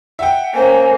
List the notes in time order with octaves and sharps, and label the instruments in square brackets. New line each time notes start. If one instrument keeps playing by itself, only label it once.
[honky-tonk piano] E5 G5 [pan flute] F#5
[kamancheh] A#3 C#4 [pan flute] C5 [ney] G#5